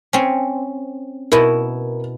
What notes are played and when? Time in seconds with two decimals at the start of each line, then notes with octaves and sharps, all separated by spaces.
0.13 C4 C#4
1.32 B2 E4 A#4